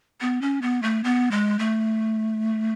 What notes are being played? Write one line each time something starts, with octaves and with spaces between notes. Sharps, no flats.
B3
C#4
B3
A3
B3
G#3
A3